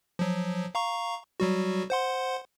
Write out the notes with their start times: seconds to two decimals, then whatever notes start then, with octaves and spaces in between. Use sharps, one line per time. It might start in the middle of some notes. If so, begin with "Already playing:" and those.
0.19 F3 F#3
0.75 F5 A#5 C#6
1.40 F#3 G3 F#4
1.90 C5 F#5 C6